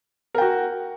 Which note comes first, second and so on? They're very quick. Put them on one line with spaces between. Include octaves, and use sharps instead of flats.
A#4 G5 F#4